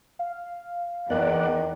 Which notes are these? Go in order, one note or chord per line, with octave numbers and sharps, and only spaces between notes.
F5
E2 D#3 B3 D5 F#5